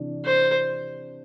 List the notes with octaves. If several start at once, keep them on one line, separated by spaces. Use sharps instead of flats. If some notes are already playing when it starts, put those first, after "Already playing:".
Already playing: C3 E3 D4
C5